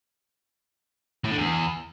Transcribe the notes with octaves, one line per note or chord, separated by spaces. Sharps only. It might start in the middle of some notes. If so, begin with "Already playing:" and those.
A2
D3
E2